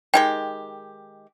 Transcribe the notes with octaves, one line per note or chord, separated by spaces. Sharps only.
D#3 G#3 G4 G5